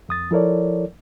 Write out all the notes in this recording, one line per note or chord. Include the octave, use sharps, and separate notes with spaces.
F2 D#6 A6
F3 E4 A4 A#4 C#5 D5